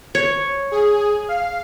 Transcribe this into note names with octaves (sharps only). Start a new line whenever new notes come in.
C#5
G#4
F5